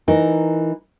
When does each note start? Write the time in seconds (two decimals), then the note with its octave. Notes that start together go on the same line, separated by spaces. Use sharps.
0.08 E3 D#4 A#4